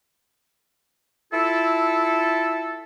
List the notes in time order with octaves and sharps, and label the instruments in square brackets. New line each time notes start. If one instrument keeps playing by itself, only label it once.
[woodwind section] E4 F4 A4